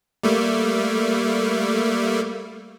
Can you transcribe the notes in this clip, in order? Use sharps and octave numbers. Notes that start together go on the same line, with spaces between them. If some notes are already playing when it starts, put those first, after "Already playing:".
G3 A3 A#3